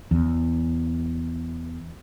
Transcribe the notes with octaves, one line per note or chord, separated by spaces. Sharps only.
E2